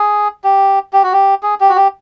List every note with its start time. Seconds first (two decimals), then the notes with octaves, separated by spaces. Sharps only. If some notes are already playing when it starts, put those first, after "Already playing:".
Already playing: G#4
0.44 G4
0.93 G4
1.03 F#4
1.13 G4
1.43 G#4
1.61 G4
1.69 F#4
1.76 G4